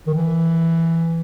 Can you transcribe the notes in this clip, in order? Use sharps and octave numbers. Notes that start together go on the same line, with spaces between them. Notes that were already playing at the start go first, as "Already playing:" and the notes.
D#3
E3